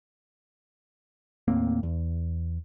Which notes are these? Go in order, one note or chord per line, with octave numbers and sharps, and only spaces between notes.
D#2 A2 A#3 C4
E2